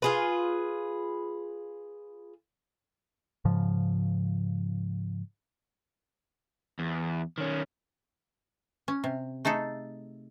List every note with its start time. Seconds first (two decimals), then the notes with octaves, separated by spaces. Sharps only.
0.02 F4 G#4 B4
3.45 G#2 C#3 F3
6.79 E2
7.38 D#3 C#4
8.88 C#4
9.04 C3
9.45 A3 D#4 G#4 A4